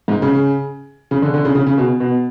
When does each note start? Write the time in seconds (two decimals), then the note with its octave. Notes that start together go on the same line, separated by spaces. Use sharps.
0.08 G#2
0.22 C#3
1.11 C#3
1.22 D3
1.34 D3
1.45 C#3
1.55 C#3
1.67 C#3
1.78 B2
2.00 B2